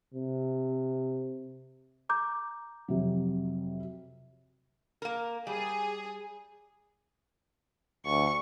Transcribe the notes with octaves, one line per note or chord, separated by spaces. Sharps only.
C3
A#5 D6 G6
F2 C3 F#3
A#3 A#4
G3 G#4
D2 C#6